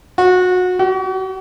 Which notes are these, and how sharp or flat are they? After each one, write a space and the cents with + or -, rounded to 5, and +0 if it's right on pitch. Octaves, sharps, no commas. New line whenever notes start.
F#4 -25
F#4 +40